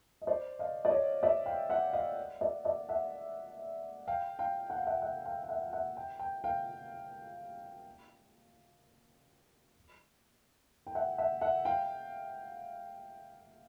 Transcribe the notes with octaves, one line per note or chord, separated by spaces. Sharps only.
D#5
C5 D5
D#5 F5
D5
C#5 D#5
D5 E5
F5 G5
E5 F#5
D#5 F5
D5 E5
D5 E5
E5 F#5
F5 G5
F5 G5
F#5
F5
E5 F#5
E5 F#5
F5 G5
G5
E5 F#5
F5
E5 F#5
G5
G5
F5 G5
G5
E5 F#5
E5 F#5
E5 F#5
F5 G5